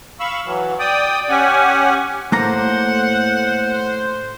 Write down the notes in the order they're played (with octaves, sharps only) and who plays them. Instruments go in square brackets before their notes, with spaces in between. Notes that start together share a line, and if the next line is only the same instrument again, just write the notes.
[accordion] F5 B5 C#6 E6
E3 F#3
D5 G5 D#6
C#4 G4 F#5 G#5
[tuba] A2 [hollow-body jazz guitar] A3 A#3 A#5 [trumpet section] C5 [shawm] F#5